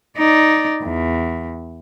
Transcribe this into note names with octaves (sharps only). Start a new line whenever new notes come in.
D#4 D5
E2